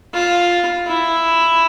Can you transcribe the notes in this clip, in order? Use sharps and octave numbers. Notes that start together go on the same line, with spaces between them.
F4
E4